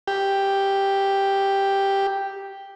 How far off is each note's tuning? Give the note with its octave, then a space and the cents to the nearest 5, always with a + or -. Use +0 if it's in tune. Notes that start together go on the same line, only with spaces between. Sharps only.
G4 +0